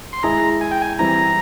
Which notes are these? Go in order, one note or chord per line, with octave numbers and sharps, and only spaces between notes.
C6
G#3 E4 G#4 A#5
G#5
G5
G#5
E3 G3 C4 E4 A#5